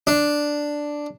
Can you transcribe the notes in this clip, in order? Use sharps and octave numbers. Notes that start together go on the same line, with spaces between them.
D4